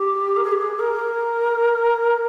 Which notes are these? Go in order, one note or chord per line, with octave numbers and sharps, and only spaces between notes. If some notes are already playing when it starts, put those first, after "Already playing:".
Already playing: G4
A#4
G#4
G4
G#4
A#4